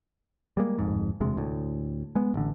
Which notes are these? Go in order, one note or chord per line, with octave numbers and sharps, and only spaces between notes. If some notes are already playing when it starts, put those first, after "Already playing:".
G3 G#3 A#3
D1 F2 G#2
E1 D2 C3 G#3
D2 A2
G#3 B3
A1 D3